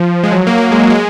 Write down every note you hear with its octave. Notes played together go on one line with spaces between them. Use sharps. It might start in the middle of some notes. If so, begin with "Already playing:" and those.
Already playing: F3
G#3
F#3
A#3
A#3
G#3
F#3
G#3